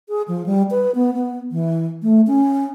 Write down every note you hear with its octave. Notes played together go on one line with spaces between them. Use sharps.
G#4
F3
G3
B4
B3
B3
E3
A3
C#4